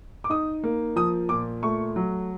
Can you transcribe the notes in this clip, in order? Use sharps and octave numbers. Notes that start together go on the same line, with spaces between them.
D6
D#4 D#6
A#3
F3 D#6
A#2 D6
A3 C#6
F#3